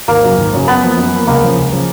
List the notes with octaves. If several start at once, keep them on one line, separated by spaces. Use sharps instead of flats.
G#1 A#3
F#2 C#3 F#3
G#1
F#2 C#3 F#3
F#2 B3
F3 A#3
F#2
F3 A#3
C#2 A#3
C#3 F3
C#2
C#3 F3